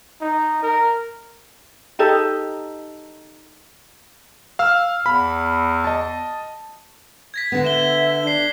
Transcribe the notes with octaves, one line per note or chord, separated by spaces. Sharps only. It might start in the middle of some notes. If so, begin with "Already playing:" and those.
D#4
A#4
D#4 G4 A4 D#5
F5 E6 F6
E2 B5
D#5 A5
G#6 A#6 B6
D3 B3
E5 E7 G7
D4 C7 G7